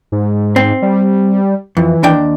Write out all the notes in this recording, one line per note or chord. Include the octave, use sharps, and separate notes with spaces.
G#2
C4
G3
F2 E3
D#2 D4 G5